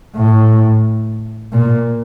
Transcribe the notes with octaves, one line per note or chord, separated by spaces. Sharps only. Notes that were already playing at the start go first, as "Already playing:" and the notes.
A2
A#2